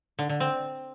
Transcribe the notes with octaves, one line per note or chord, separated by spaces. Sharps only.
D3
D3
C4